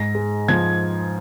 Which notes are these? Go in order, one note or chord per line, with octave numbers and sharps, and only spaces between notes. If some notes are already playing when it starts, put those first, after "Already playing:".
Already playing: G#2 A#6
G#3
F3 G#6